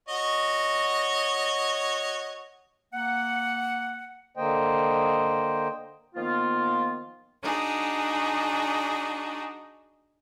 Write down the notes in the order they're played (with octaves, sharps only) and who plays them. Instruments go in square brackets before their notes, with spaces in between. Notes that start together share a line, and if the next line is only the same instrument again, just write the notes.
[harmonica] F#4 C#5 D#5
[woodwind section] A#3 F#5
[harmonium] D3 A#3 C5 D#5 G5
[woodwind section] D#3 F3 A#3 B3 F4
[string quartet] D4 D#4 F#4 G#4